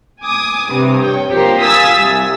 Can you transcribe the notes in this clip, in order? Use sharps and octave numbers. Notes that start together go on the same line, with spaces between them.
G#5 D6 D#6
G2 C3
C#5 G5
F3 A#3 G4 C5
F5 G#5 D#6 E6 A6 B6
C2